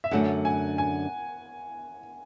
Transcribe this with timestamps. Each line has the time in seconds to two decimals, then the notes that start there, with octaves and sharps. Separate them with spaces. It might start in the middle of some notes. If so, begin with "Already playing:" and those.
0.04 E5
0.11 F#2 D3 A3 D4 F#4 F#5
0.45 G#5
0.78 G#5